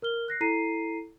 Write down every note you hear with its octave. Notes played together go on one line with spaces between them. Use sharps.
A#4 F6 G7
F#6 A#6 C7
E4 A4 A#5 C7 D#7